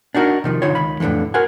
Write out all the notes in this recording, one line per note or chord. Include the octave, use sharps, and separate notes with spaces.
D4 D#4 F#4 A#4
C3 D#3 F3
D3 D#4 F4 C#5
C#2 D#3 B5
F2 A2 D3 E3 F3
F#4 A#4 C5 F#5 G#5